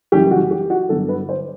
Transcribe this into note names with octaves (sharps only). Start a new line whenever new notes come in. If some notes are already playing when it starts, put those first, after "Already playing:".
F#1 F#2 E3 G3 G4
F#4
G4
F#4
G1 G2 F#3 B3 A4
B4
C5